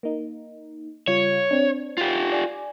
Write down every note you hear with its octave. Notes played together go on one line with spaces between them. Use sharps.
A#3 D#4
C#3 G3 F4 C#5
C4 D4
F4 G4
D5 G#5